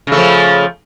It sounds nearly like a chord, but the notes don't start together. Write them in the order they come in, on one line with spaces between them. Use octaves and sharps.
C#3 A3 F3